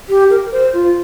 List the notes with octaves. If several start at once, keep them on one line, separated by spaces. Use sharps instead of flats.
G4
A#4
C5
F4